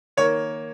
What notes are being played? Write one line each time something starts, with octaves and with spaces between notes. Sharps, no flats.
D#3 A#3 C#5